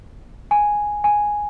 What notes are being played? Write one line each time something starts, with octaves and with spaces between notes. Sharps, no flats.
G#5
G#5